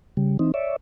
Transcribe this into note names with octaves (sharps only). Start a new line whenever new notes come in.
C#3 G3
E3 C4 D#4
C#5 D5 E5